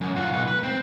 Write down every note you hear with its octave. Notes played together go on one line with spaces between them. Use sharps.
F#2
F4 F#4
B1 B4
B4
C4